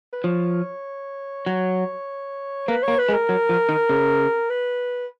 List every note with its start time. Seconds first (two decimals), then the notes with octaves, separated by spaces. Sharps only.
0.13 B4
0.24 F3 C#5
1.46 F#3
2.68 A#3 B4
2.83 A#3 C#5
2.99 B4
3.09 G#3
3.13 A#4
3.29 F#3
3.49 F3
3.69 D#3
3.89 C#3
4.50 B4